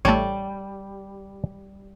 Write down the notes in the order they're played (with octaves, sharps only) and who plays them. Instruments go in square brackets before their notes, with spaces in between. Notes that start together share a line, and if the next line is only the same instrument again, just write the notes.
[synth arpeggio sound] A1 A3 [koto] G3 [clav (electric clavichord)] C#5 A5